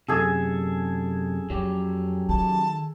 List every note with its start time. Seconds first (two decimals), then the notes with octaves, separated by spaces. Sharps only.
0.08 F#2 C3 G#4 A4
1.50 F2 F#3 C#4 G4
2.29 D#3 A5